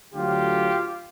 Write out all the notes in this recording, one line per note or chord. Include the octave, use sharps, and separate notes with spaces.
D2 D3 F#3 F4 G4